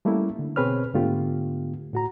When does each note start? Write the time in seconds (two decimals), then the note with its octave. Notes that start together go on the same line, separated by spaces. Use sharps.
0.05 G3 A3 A#3 C#4 E4
0.39 D3
0.56 B2 C4 G#4 B4 C#5 F6
0.94 G#2 D3 A3 B3 F4 G4
1.93 A2 F#4 A#5